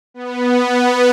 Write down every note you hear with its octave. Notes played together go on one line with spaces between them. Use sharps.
B3
B3